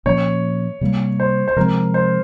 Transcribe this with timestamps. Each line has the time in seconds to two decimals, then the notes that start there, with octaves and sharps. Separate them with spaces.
0.05 A#2 F3 A#3 C#4 C#5
0.81 C3 G3 A#3
1.20 C5
1.48 C5
1.56 C3 F3 G#3 C4 A#4
1.94 C5